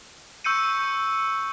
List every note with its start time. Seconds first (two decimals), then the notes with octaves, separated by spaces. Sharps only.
0.44 C#6 E6 G6 C#7 D#7